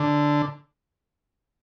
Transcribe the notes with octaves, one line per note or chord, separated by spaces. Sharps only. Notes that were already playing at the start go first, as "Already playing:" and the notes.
Already playing: D3